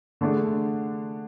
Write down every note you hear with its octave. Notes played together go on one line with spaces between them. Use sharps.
D3 A3 D4 G#4